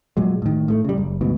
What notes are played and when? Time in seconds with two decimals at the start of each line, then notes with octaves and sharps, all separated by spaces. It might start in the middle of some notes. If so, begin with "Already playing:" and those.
0.17 A#2 F#3 G#3
0.42 A2 D#3
0.68 A2 G#3 A3
0.85 C#3 G3
0.98 F#1
1.21 D2 G#2 B2